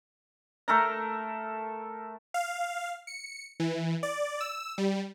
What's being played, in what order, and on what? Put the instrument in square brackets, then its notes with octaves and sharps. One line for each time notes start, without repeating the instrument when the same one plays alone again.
[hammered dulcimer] A3 A4 A#4 A#5
[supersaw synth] F5
C#7
E3
D5
E6
G3